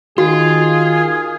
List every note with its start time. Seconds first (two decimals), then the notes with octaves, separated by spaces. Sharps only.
0.18 D#3 F4 F#4 G#4